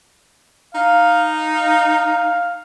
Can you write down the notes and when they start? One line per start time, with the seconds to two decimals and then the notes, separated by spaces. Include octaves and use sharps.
0.74 D#4 F5
1.55 F5